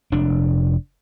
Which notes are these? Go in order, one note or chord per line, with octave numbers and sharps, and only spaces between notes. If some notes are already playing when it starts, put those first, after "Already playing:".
F1 D4